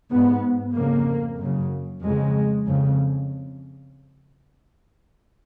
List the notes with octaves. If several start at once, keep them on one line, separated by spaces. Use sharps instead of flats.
G#2 B3
F2 C#3 A#3
F#2 C#3
F2 C#3 G#3
F2 C#3